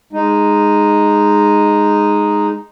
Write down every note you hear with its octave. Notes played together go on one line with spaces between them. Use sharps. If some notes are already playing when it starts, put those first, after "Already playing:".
G#3 D#4